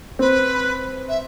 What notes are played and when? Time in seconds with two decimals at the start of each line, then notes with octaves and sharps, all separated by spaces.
0.19 C4 B4
1.09 E5